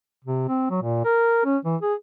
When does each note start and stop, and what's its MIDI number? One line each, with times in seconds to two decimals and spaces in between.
0.25 0.43 48
0.48 0.68 60
0.70 0.82 54
0.82 1.03 46
1.05 1.44 70
1.45 1.57 61
1.65 1.76 52
1.81 1.94 68